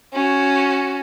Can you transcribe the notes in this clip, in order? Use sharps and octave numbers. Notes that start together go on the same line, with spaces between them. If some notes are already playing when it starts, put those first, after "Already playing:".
C#4 F#4